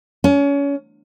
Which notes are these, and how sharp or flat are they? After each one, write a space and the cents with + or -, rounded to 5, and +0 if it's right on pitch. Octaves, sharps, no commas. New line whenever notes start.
C#4 +30